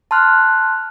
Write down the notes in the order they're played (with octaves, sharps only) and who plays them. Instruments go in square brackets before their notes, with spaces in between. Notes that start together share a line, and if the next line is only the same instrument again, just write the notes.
[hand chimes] A5 C6 F6 F#6